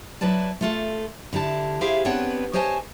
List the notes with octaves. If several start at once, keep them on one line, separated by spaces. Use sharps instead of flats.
F#3 E4 B4 D5 A5
A3 F4 A4
D3 E4 G4 A5
E4 G4 G#4 C5 E5 F5
B3 C4 D4 B4 C#5 F#5
G4 C5 C#5 D#5 G#5 A5